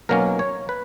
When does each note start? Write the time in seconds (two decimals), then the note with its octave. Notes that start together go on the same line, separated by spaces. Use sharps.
0.09 B1 B2 F#3 A#3 C#4 A#4
0.39 C#5
0.69 B4